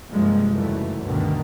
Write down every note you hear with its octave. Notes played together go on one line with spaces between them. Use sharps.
G2 C3 F3 G3 G#3 A#3
F#1 D#2 E3 F#3 G3 A3
D2 G2 B2 D3 D#3